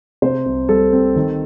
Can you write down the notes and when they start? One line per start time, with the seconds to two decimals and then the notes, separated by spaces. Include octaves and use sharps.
0.22 C3 C5
0.46 C2
0.69 G3 A4
0.93 C4
1.16 D#3